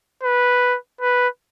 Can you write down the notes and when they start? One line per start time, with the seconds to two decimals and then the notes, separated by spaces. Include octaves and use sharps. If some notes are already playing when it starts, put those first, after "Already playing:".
0.23 B4
1.01 B4